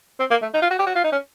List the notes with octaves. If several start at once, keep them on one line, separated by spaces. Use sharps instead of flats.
C4
A#3
A3
D#4
F4
F#4
G4
F#4
F4
D#4
C#4